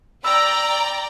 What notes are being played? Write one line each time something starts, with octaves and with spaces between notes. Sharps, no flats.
D5 G5 A#5 B5 E6